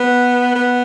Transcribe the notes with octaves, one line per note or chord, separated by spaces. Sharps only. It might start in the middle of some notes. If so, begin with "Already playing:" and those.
Already playing: B3
B3